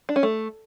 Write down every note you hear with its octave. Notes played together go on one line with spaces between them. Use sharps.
D4
C#4
A3